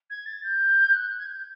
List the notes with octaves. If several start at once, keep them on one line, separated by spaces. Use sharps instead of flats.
G#6
A6
G6
F#6
F#6
G#6
G6